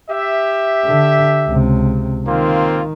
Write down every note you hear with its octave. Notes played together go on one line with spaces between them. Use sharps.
G4 E5
D3
C#2 C3
D#3 A#3 C4 F4